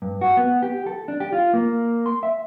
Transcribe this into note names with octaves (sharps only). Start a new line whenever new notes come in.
G2
F#4
B3
G4
A4
D4
G4
F4
A#3
C6
E5